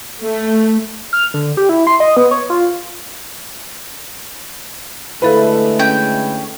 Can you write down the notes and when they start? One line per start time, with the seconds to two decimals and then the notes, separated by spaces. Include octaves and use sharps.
0.22 A3
1.13 F6
1.34 D3
1.57 G4
1.69 E4
1.87 C6
2.00 D#5
2.17 B3
2.31 C#5
2.50 F4
5.22 D3 G#3 A3 E4 A4 B4 F5 B5
5.79 C#4 G5 G6